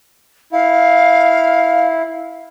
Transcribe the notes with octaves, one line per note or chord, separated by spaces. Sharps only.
E4 F5